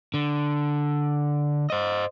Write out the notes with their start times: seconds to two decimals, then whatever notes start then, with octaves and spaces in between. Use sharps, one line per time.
0.14 D3
1.70 C5 D#5